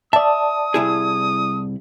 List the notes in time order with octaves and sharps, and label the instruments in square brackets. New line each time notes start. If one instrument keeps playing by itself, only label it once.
[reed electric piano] D5 A5 [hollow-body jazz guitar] E5 [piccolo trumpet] D#6
[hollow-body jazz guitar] C2 E4 G#4